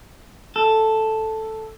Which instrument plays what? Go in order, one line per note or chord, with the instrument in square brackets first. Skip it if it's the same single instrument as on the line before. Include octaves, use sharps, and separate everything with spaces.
[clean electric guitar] A4